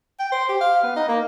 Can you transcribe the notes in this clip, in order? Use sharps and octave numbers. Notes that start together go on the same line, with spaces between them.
G5
C5
G4
F5
B3
D#4
A#3